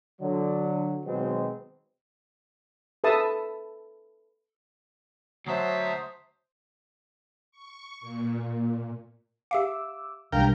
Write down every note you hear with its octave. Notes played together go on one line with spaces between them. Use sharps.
D3 F#3
B2 D#3 F#3 G#3 B3 C4
A4 B4 E5 A5 D#6
D2 F#3 C5 E5 A5 D#6
C#6
A#2
G4 E5 F5 D6 E6
B1 E3 G3 D4 A#4 F5 G5 F6